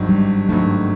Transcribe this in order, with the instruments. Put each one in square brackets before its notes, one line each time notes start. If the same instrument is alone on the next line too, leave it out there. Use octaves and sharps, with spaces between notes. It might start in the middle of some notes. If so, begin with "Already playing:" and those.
Already playing: [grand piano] G#1 G2 D#3 F#3
[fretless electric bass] G3
[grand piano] G#1 G2 D#3 F#3 [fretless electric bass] A3